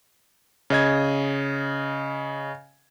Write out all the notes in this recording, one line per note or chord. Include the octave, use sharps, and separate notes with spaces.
C#3 D#5 G#6